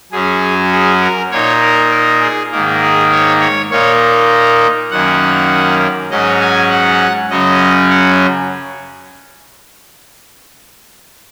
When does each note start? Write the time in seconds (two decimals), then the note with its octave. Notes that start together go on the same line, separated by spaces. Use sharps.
0.12 F#2 F#3 C#4 G#4
0.72 G#4
1.01 A#4
1.32 A#2 A#3 D#4 C#5
1.61 A#4
1.92 A#4
2.22 G#4
2.51 G#2 D#3 A#3
2.82 G#4
3.11 C#5
3.41 C#5
3.71 A#2 A#3 D#4 C#5
4.91 F#2 D#3 A#3 C#4 F#5
6.11 G#2 F#3 C#4 D#5
6.41 G#5
6.70 F#5
7.30 F#2 C#3 F#3 C#4 D#5
7.90 F#5